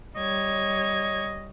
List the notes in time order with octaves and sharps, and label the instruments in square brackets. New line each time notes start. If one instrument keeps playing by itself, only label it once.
[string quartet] G3 C#5 G#6 [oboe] D#5